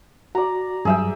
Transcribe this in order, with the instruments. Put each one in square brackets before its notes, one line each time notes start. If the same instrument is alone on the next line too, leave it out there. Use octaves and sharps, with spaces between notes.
[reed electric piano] F#4 [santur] D5 A#5
[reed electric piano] G2 F#3 [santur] G#4 E5 G5